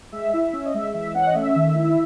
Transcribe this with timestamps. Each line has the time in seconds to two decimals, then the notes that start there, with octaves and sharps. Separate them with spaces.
0.12 G#3 E5
0.33 E4
0.53 C#4
0.66 D#5
0.74 G#3 E5
0.94 E3 E5
1.15 C#4 F#5
1.26 D#5
1.35 A3 E5
1.55 D#3
1.75 E4